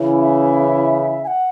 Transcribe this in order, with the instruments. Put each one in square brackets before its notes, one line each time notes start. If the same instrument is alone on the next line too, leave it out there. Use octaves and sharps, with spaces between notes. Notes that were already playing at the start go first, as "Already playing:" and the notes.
Already playing: [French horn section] C#3 E3 C#4 E4
[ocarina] E5
G#5
F#5